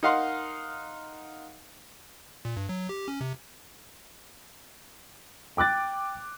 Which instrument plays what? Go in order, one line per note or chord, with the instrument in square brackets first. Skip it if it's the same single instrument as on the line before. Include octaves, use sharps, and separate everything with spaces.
[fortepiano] D#4 A#4 D#5 F5 F#5 C6
[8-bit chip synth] A#2
G2
F#3
G4
C#4
C3
[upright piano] G5 D6 F#6 A6